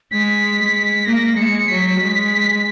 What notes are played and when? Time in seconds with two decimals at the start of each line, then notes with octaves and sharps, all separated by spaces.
0.11 G#3 B6
0.58 G#3
1.05 A#3 A#6
1.37 G#3 C#7
1.68 F#3 B6
2.00 G#3